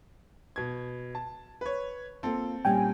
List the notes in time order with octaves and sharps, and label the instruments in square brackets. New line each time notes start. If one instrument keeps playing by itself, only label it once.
[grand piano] B2 G#6
A5
B4 C#5
[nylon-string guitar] A#3 F4 [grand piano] C4 A4
[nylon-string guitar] A#2 G3 C#4 [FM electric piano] G5 G#5